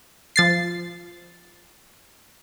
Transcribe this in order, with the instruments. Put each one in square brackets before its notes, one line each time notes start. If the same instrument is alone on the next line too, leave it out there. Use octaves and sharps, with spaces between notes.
[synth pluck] F3 A6 C7